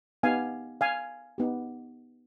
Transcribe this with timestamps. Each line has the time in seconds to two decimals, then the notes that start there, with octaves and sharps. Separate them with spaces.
0.23 B3 D#4 G4 F5 G#5
0.81 F5 G#5
1.38 B3 D#4 G4